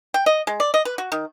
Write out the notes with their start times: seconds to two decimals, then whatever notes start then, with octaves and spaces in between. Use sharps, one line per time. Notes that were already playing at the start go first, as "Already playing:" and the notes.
0.14 G5
0.26 D#5
0.47 G#3
0.60 D5
0.74 D#5
0.85 B4
0.98 F#4
1.12 D#3